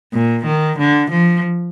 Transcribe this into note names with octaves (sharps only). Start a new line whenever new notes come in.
A#2
D#3
D3
F3